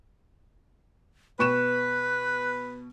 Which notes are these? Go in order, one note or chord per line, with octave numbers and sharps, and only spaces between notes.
B2 B4 C#6 F#6 E7